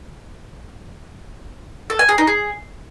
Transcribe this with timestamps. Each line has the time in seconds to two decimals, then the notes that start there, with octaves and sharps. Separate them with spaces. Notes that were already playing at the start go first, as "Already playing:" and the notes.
1.90 A4
1.99 G#5
2.09 G#4
2.18 D#4
2.27 G#4